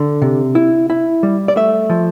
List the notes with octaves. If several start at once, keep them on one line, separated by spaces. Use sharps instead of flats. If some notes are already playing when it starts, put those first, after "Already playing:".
Already playing: D3
C3
E4
E4
G3
D5
A3 E5
F3